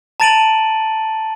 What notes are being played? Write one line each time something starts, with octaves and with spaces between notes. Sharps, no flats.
A5 A#5 A6 D7 D#7 F#7